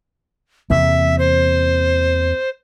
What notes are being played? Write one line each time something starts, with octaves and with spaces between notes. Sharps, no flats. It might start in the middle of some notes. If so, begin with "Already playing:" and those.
E2 C3 A#3 E5
C5